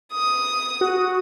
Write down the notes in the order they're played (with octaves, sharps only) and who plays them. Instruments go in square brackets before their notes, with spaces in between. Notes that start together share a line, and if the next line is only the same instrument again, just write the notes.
[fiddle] D#6
[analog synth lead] F#4